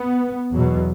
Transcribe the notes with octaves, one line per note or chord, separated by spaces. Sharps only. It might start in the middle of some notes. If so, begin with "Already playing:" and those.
Already playing: B3
E2 B2 F#3